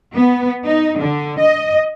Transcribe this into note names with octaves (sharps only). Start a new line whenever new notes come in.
B3
D#4
D3
D#5